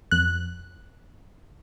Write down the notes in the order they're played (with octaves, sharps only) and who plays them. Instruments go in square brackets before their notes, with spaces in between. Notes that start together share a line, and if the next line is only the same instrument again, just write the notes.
[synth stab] F2 F#6